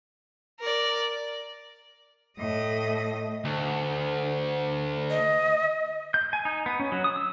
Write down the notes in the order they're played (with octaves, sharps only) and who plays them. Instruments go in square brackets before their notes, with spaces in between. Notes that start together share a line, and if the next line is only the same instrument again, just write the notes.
[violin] A#4 D5
[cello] A2 D#5
[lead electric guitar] D2
[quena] D#5
[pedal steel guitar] G6
G#5
D#4
B3
C#4
F#3
D#6
E6